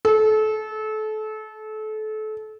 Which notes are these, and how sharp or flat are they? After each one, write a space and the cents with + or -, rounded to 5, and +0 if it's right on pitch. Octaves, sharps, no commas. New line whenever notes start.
A4 -30